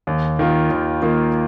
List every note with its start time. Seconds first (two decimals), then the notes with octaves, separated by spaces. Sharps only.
0.07 D#2
0.39 D#3 A#3 F4
0.71 D#2
1.02 D#3 A#3 F4